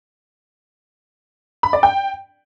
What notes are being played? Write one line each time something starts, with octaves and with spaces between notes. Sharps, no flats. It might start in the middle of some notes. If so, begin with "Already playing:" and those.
B5
D5
G5